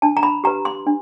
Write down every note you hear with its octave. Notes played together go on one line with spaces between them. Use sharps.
D4 A5
A#5
B5
G4 B4 A#5
C6
D4